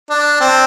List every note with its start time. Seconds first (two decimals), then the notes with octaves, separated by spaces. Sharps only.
0.10 D4
0.40 C4